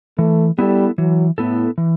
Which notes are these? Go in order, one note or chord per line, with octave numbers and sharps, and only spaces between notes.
E3 A3
G3 B3 E4 A4
E3 F#3
A2 B3 E4 A4
E3